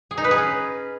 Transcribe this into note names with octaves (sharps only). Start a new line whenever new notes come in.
G#4
D#4
B4
G#4
C#4